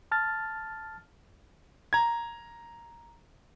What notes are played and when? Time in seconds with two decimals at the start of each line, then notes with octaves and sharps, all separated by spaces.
0.12 A5 F6 A6
1.93 A#5 G#6